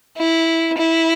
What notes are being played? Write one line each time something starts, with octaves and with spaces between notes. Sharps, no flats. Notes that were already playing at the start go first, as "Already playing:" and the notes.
E4
E4